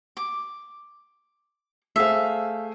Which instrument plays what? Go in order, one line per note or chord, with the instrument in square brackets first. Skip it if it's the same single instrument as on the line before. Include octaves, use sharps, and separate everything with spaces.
[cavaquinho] D6
[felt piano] A3 G#4 C5 [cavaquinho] E5 F5